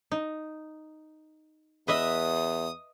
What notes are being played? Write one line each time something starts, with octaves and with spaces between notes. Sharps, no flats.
D#4
E2 B4 D#5 E5 D#6